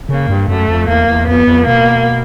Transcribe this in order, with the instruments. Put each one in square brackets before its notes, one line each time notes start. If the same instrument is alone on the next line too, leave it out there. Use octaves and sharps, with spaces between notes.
[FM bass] C#3 [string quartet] A#3
[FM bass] G2
[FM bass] F#2 [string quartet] A3
[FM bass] F2
[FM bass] E2 [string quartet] A#3
[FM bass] E2
[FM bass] F2 [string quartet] B3
[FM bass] F2
[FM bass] B2 [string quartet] A#3